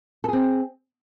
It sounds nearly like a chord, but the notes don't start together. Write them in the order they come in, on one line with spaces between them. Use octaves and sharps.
A4 G#4 C4